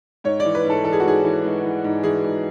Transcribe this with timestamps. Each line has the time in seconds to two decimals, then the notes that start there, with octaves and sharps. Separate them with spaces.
0.24 G#2 C#5
0.40 D5
0.45 E3
0.55 B4
0.65 G#2 A4
0.84 E3 A4
0.93 G#4
1.00 F#4
1.05 G#2 G#4
1.24 E3
1.44 G#2
1.64 E3
1.84 G#2
2.03 E3 G#4
2.24 G#2